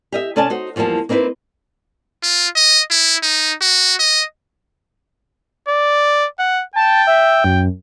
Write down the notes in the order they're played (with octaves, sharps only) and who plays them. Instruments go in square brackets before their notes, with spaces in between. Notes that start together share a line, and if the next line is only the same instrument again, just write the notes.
[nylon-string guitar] G4 D#5 E5
C3 C#4 A4 D5 G#5 A5
D#4 F#4 C5
E2 F3 G3 A#3 A5
A#3 C4 D#4 E4 B4
[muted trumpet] F4
D#5
E4
D#4
F#4
D#5
[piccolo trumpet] D5
F#5
[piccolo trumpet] G5 [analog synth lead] A5
[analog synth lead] E5
F#2